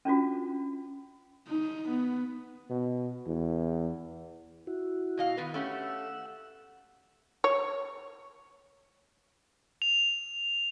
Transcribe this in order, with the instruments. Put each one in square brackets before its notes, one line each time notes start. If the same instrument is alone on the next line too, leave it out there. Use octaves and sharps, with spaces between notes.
[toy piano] C#4 D4 F4 F#4
[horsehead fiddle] D#4
B3
[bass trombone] B2
E2
[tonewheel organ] E4 F#4
[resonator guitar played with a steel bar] B2 D#5 F5
D#3 B3 B4
[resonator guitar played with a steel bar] A3 C#4 G4 [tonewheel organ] F#5 E6
[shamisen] C#5
[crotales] F7